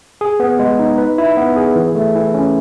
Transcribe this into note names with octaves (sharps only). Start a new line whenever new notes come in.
G#4
B3
G#3
D#4
B4
E4
B3
G#4
E3
A3
E3
C#4